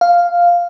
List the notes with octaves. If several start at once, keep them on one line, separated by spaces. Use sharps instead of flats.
F5